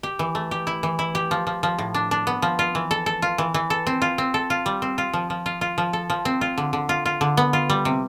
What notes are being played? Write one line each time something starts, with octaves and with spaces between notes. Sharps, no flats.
G4
E3
A3
G4
E4
E3
E4
G4
F3
F3
F3
A2
D4
D4
B3
F3
F4
E3
A4
A4
F4
E3
E3
A4
C4
F4
C4
A4
F4
G3
C4
F4
F3
F3
F4
F4
F3
A4
F3
C4
F4
D3
D3
F4
F4
D3
B3
F4
G3
C3